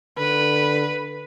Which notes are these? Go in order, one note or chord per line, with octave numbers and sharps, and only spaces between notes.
D3 B4